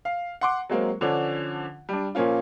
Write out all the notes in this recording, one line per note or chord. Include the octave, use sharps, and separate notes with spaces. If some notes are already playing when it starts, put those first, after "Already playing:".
F5
F#5 C6 D6
F#3 G#3 A#3 C4
D3 F3 C#4 D4
G3 D4
A#2 F3 A#3 C#4 F4